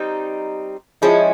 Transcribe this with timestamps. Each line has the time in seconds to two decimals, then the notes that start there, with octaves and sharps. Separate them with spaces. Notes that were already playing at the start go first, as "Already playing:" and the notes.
Already playing: G3 C4 D#4
1.02 F3 G#3 C#4 E4